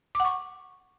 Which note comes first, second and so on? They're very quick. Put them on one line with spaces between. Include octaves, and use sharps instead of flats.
D6 F#5 C#6